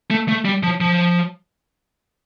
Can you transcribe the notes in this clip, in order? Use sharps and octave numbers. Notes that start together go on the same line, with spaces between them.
A3
A3
G3
F3
F3